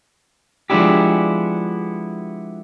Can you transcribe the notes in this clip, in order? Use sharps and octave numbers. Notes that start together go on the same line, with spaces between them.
F3 G#3 B3 D4 E4 G4